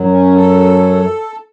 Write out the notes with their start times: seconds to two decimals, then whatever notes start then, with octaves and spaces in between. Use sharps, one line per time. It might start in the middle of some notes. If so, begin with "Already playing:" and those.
Already playing: F#2 F#3
0.09 C#4
0.35 A4